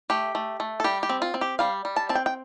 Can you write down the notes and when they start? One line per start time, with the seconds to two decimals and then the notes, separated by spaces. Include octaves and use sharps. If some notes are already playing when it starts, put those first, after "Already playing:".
0.10 A3 G4
0.35 A3
0.60 A3
0.80 A4
0.84 G3 G4
1.03 G4
1.09 C4
1.22 F4
1.34 C4
1.41 G4
1.59 G3 F5
1.85 G3
1.96 A5
2.09 C4 A5
2.15 G5
2.26 G5